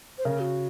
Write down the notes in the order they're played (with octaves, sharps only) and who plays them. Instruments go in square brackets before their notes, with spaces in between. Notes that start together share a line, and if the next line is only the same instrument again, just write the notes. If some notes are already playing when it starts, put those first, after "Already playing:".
[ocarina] C5
[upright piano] C#3 [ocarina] A#4
[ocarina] F#4